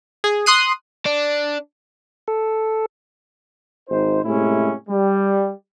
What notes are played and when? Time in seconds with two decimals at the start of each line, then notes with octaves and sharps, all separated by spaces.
0.24 G#4
0.46 C6 D#6 F#6 C7 D#7
1.06 D4
2.28 A4
3.90 G#1 D#4 C5
4.25 A2 C3 G#3 C#4 E4
4.89 G3